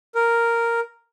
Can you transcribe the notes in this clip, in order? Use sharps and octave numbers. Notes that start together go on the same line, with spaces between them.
A#4